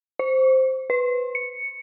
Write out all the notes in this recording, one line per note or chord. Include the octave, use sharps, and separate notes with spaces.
C5
B4
C#7